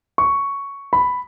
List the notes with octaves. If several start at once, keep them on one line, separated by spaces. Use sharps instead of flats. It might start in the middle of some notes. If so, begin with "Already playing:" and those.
C#6
B5